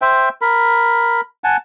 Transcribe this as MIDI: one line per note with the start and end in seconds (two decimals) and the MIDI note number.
0.02 0.29 72
0.02 0.29 76
0.02 0.29 79
0.41 1.21 70
0.41 1.21 83
1.44 1.57 78
1.44 1.57 80
1.44 1.57 81